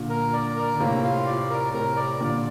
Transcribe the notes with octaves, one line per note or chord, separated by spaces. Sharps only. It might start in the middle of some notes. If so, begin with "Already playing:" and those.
Already playing: A#2 D3
A#4
D5
A#4
D3
A2 C3 A#3
F4
D5
A#4
A2 C3 A#4
D5
A#2 D3 D5